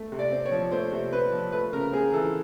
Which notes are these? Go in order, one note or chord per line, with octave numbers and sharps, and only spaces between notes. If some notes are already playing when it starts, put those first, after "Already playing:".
Already playing: A3
C3
D5
C4
C#5
F3
A3 C5
C3
C4 B4
F3
A3 B4
C#3 A#4
C4 G#4
E3 A4